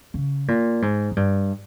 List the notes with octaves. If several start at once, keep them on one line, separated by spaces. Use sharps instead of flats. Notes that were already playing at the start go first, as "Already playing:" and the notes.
C#3
A#2
G#2
G#2
G2